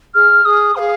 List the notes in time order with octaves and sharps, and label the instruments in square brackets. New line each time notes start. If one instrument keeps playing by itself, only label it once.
[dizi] G#4 [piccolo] F6
[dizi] G#4 [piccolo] D#6
[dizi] C5 [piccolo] F5
[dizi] G#4